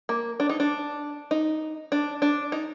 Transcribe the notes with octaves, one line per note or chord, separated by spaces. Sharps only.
A#3
D4
D#4
D4
D#4
D4
D4
D#4